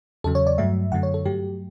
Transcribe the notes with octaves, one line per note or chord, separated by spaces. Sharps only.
E2 C#3 F#3 A4
C#5
D5
G2 F#3 A3 E5
F#2 D3 F#3 A3 F#5
C#5
A4
G2 F#3 A3 G4